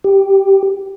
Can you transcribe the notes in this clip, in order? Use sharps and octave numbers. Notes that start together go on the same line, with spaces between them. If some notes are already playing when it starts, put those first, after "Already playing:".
G4